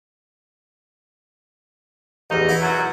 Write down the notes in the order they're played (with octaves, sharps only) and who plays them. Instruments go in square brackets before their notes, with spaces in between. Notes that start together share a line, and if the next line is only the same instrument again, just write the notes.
[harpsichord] A1 E2 [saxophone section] D#4
[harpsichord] E4 F#4 B4
[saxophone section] F#2 F#3